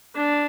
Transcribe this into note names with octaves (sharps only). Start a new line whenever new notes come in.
D4